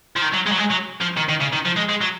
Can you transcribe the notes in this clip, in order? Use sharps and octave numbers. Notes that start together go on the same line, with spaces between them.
F3
D#3
F#3
G#3
F#3
G#3
F#3
F3
D#3
D#3
C#3
D#3
F3
G#3
G#3
F#3